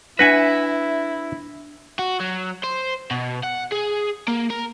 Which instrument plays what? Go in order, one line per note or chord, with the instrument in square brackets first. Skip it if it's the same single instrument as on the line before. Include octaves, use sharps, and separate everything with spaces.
[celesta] D4 A#6 [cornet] E4 [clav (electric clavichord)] B4 F#5 G#5 [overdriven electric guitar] E5
[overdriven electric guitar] F#4
F#3
C5
B2
F#5
G#4
A#3
A#4